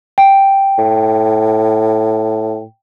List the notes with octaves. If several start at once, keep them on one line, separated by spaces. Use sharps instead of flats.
G5
A2